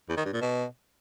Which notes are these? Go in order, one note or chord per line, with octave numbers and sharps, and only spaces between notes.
E2
D#3
G2
A#2
B2